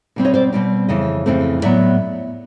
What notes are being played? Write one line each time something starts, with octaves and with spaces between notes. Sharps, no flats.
B2 G3 C4
C#5 D#5
C5 D5
B2 G3 C4
F2 C#3 E3 D#5
F2 C#3 E3 A3 C4
A2 F#3 B3 D5 E5